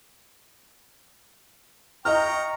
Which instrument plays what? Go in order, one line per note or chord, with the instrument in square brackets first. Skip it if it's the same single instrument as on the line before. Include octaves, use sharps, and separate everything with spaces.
[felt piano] D#5 F6 [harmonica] G5 A#5 C#6